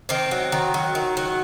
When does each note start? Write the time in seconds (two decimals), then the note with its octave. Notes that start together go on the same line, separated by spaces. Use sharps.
0.09 D#3 C4
0.31 F#3
0.52 D#3
0.74 F#3
0.95 D#3
1.17 F#3